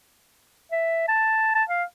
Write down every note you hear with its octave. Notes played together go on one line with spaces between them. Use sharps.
E5
A5
A5
F5